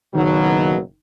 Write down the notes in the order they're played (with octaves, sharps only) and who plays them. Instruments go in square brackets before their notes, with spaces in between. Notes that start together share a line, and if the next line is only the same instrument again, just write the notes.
[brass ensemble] F#1 B2 F#3 [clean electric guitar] D#3